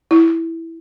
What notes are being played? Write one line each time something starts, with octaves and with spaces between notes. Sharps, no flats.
E4